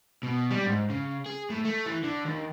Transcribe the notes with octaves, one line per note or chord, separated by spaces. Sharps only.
B2
G3
G#2
C#3
G#4
A2
A3
E3
D3
D#2